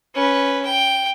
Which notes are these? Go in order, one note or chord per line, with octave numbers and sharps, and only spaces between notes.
C#4 B4
G5